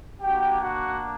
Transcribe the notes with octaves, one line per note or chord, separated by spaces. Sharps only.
A#3 D4 F#4 G4 G5
F#4 F#5